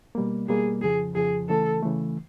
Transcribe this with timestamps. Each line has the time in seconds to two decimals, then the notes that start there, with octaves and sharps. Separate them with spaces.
0.15 B2 G3 A#3
0.49 B2 G3 A#3 G#4
0.82 F2 C#3 F3 G#4
1.15 F2 C#3 F3 G#4
1.49 C#3 E3 A3 A4
1.82 C#3 E3 A3